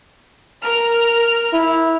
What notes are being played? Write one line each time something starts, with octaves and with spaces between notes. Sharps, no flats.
A#4 F6
E4